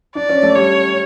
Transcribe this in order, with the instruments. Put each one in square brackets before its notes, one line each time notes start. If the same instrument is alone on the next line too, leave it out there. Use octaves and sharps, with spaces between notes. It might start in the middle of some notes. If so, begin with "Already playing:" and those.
[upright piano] D4 [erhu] D5
[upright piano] C#4
A3
[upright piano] G3 [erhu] C#5